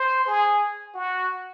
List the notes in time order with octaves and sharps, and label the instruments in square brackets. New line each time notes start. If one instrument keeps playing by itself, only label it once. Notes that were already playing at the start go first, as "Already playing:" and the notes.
Already playing: [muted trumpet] C5
G#4
F#4